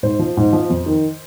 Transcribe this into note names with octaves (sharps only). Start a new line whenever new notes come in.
G#2 C5
F3
G#2
F3
F2
D#3